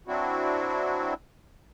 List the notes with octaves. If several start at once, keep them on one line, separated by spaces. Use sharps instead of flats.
F#3 C4 D4 E4 F#4